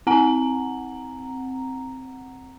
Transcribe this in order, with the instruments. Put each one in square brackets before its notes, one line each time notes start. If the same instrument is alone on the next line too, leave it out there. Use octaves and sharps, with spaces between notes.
[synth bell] C4 F#5 A#5